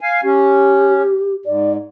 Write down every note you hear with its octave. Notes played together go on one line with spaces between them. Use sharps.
F5 G#5
C#4 G4
G#2 D5